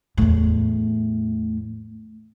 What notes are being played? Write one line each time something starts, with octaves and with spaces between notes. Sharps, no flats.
E2 A2